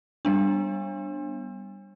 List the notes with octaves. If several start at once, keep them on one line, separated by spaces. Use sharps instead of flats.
G3 B3 D4